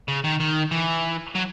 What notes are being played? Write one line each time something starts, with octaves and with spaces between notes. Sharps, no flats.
C#3
D#3
D#3
E3
F#3